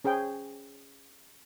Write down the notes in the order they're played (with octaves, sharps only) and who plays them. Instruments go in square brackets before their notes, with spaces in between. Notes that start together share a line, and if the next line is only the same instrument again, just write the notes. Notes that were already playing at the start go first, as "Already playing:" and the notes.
[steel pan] C#4 G#4 C5 G5